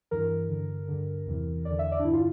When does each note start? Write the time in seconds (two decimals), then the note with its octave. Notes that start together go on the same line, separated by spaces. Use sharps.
0.11 G2 E3 A#4
0.49 G2 D3
0.88 G2 D3
1.26 E2 C3 E3
1.65 E2 D3 D5
1.79 E5
1.92 D5
1.99 D4
2.04 G2 D3 E4
2.13 F4